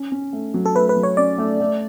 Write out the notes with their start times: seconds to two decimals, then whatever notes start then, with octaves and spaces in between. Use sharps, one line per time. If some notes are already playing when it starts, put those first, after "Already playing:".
Already playing: C#4
0.12 C#4
0.33 A3
0.54 F#3
0.66 A4
0.75 A3 B4
0.89 B4
0.97 F#3
1.03 C#5
1.17 C#4 D5
1.38 A3
1.60 A3